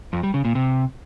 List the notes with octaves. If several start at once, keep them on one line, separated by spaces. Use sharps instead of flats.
F2
G3
C#3
A#2
C3